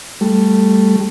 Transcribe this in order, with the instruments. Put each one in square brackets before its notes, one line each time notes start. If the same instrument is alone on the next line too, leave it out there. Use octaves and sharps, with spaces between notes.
[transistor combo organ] G3 A3